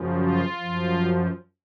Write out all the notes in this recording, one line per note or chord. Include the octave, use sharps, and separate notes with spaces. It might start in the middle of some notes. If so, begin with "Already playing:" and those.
Already playing: F#2 C#3 F3
F4
F#2 F3